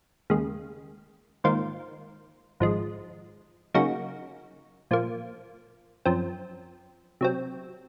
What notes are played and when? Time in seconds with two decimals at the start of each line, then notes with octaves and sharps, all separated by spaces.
0.30 D#2 C#3 G#3
1.44 G#2 D#3 A#3 F4 C5
2.60 G#1 G#2 F3 G#3
3.74 C#3 F#3 A#3 D#4 F#4
4.91 A#2 F3 A#3
6.05 F#2 F3 C4
7.21 C3 F#3 C4